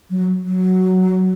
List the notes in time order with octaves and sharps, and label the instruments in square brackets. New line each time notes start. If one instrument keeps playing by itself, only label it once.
[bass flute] F#3
F#3